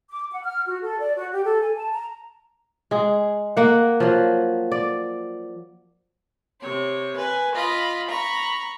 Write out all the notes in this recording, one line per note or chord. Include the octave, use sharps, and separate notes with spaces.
D6
F#5
F6
F#4
A4
D5
F#4
G4
A4
G#5
A5
A#5
G#3 G#4
A#3 F#5
F3 F#3
D5
C3 C#5
B4 G#5
F4 D#5 B5
A#5 B5 C#6